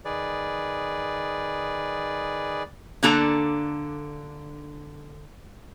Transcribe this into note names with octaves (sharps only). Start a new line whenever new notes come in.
D#3 G#4 B4 D5
D3 A#3 D4 A4 A#5